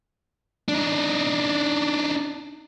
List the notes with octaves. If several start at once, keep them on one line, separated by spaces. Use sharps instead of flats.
D4 D#4